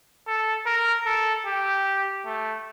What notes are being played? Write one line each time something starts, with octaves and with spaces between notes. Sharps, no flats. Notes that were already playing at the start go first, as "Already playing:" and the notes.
A4
A#4
A4
G4
A3